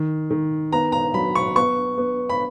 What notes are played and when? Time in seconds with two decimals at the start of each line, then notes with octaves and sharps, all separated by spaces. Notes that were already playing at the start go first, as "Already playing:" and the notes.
Already playing: D#3
0.31 D#3
0.72 B3 A#5
0.92 A#5
1.14 F#3 B5
1.35 C#6
1.55 B3 C#6
1.98 B3
2.29 B5